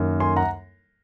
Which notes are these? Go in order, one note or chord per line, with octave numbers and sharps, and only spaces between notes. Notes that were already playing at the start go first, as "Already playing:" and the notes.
Already playing: F#2 D#3 A#3
G#5 C6
F#5 A#5